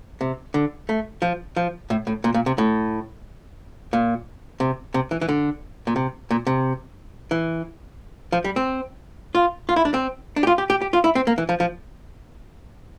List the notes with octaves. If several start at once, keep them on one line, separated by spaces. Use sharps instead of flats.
C3
D3
A3
F3
F3
A2
A2
A#2
A#2
C3
A2
A#2
C3
C3
E3
E3
D3
A#2
C3
A#2
C3
E3
F3
G3
C4
F4
F4
E4
D4
C4
D4
G4
F4
G4
G4
G4
F4
E4
C4
A#3
E3
F3
F3